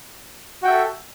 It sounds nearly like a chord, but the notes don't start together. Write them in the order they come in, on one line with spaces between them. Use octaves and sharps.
F#4 G5 E5 A4